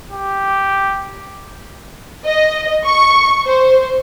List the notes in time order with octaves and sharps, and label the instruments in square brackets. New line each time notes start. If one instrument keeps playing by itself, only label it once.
[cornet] G4
[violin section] D#5
C#6
C5